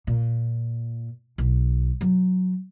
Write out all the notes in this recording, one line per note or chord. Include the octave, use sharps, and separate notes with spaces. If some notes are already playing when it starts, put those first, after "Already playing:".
A#2
B1
F#3